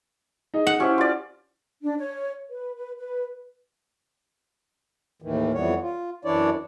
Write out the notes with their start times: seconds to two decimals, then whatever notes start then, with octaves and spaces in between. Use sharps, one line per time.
0.54 D#4 G#4 D#5
0.67 F#5
0.80 C#4 E4 G4 C5
0.98 F4 D5
1.83 D4
1.99 C#5
2.50 B4
2.77 B4
2.98 B4
5.22 D#2 A2 D#3 E3
5.54 F2 E3 G3 B3 C#5
5.81 F4
6.25 F#2 E3 D4 E4 C#5 D5